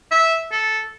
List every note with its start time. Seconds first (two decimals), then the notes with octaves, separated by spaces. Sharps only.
0.11 E5
0.52 A4